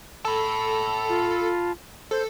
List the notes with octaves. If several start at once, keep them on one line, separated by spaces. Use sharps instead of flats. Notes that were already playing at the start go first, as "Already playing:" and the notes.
A4 A5 B5
F4
A4 C5